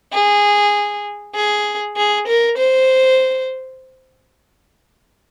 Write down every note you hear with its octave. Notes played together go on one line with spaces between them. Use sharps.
G#4
G#4
G#4
A#4
C5